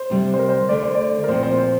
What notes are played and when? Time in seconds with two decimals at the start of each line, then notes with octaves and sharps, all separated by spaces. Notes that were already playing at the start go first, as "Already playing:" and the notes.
Already playing: C5
0.10 D2 C3 G3 D4
0.34 C5
0.39 A#4
0.49 C5
0.69 D2 D3 A3 D4 D5
0.83 C5
0.94 D5
1.24 A#4
1.28 A#2 F3 C4 C5
1.43 C5
1.59 C5